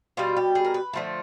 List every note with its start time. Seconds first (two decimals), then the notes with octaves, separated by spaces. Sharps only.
0.17 B2 G3 F4
0.37 G4
0.55 G#4
0.65 A#4
0.74 B4
0.93 D3 F3 A3